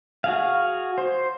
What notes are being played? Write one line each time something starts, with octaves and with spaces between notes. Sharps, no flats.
F#4 G#4 F5
C5